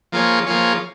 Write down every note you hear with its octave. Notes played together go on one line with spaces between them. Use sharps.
F3 A#3 F4 G#4 C#5
F3 A#3 F4 G#4 C#5